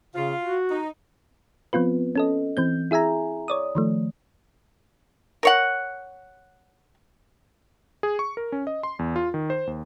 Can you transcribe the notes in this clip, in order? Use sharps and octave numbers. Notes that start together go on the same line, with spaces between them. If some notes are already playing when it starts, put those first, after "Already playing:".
C#3 F4
F#4
D#4
F3 B3 C4 F4 B4
C#4 A4 D#5
E3 C4 G6
E4 G#4 E5 G#5 A#5
C#5 D5 D#6
D#3 F3 A3
A#4 C#5 F#5
G#4
C#6
A#4
C#4
D#5
C6
E2
F4
D#3
C5
D#2